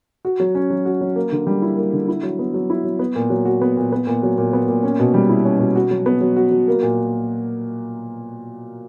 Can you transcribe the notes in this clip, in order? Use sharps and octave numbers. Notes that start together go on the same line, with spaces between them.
F#4
F#3
C#4
F#3
F#4
F#3
A#3
D3
G3
E4
A#3
D3
E4
F#3
B3
F#3
E4
F#3
B3
A#2
F#3
F#4
B3
A#2
B3
A#2
F#3
A#2
B3
A#2
C#4
B2
G3
E4
C#4
B2
F#4
F#3
B3
F#3
F#4
F#3
A#3
A#2